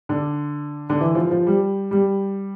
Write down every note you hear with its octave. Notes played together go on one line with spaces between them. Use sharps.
D3
D3
E3
F3
F3
G3
G3